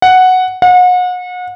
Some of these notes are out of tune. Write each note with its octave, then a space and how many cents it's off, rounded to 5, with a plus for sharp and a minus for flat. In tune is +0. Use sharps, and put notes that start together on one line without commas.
F#5 +0
F#5 -35